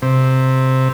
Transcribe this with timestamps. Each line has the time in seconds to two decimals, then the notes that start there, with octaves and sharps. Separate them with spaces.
0.02 C3